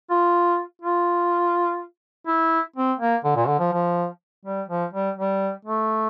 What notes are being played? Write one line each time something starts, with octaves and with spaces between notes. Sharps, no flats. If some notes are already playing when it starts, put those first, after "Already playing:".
F4
F4
E4
C4
A#3
D3
A#2
D3
F3
F3
G3
F3
G3
G3
A3